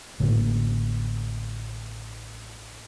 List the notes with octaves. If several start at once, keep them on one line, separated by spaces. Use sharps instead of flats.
A1 A2 D3 A#3